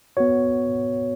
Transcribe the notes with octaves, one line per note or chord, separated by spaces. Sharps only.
B3 F#4 C#5